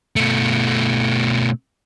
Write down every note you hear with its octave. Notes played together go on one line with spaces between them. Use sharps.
B2 A3